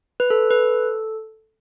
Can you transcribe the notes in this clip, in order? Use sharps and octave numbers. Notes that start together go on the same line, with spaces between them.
B4
A4
B4